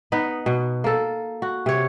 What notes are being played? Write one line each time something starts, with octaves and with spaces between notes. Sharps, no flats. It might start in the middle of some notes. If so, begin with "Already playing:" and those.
B3 D#4 B4
B2
A#3 A4
F#4
C3 C#5